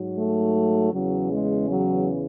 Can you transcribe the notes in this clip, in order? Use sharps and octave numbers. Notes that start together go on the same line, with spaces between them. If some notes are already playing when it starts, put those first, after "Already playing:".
Already playing: G#2 F#3
A3
E2 C#3 E3 F#3
G#3
F#3